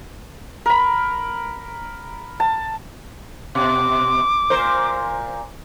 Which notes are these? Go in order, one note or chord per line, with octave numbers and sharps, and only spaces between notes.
A#4 B5
A5
B2 D6
A#2 A#4 C5